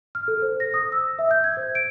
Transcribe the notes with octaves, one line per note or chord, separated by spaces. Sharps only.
F6
A4
C5
A#6
D#6
E6
E5
G6
G#6
C5
D7